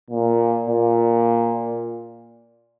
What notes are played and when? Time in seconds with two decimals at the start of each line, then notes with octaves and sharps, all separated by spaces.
0.10 A#2
0.67 A#2